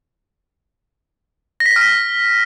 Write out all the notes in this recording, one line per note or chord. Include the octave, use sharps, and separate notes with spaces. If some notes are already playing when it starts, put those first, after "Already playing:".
A#6
B6
A#6
F6
B6